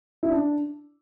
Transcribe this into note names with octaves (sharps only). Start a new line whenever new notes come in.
E4
D4